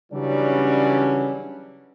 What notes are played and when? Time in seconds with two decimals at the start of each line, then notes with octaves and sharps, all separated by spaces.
0.13 C#3 E3 F#3 G3 C#4 D4